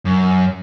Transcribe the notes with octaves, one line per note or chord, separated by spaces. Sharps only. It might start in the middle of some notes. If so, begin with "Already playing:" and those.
F#2